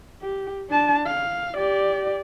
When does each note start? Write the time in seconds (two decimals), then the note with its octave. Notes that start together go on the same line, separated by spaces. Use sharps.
0.21 G4
0.70 D4 A5
1.06 F5
1.57 G4 D5